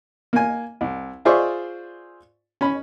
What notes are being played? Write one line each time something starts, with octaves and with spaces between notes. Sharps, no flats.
A#3 G#5
C2
F4 G#4 C5 D5 E5 C#6
C#4 B5